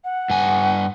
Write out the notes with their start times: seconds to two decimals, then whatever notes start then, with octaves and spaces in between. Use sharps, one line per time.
0.04 F#5
0.30 G2 G#5